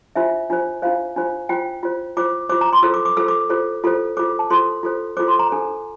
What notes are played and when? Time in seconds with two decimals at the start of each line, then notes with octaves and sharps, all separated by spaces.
0.16 D4 F4 C5 E5
0.50 D4 F4 C5
0.82 D4 F4 C5 F5
1.16 D4 F4 C5
1.49 F4 C5 G5
1.83 F4 C5
2.17 F4 C5 D6
2.49 F4 C5 D6
2.61 A#5
2.73 C6
2.83 F4 A4 C5 E6
2.94 D6
3.05 D6
3.17 F4 A4 C5 E6
3.28 D6
3.49 F4 A4 C5
3.84 F4 A4 C5
4.17 F4 A4 C5 D6
4.39 A5
4.50 F4 A4 C5 C6
4.83 F4 A4 C5
5.17 F4 A4 C5 D6
5.28 C6
5.39 A#5
5.50 D4 A4 C5